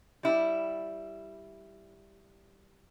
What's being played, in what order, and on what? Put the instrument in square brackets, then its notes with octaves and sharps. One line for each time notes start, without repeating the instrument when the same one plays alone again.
[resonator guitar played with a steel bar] G3 E4